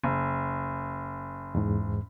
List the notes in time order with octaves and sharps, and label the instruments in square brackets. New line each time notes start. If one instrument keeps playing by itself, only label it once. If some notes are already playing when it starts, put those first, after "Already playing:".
[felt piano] F#1
[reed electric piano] E2 G#2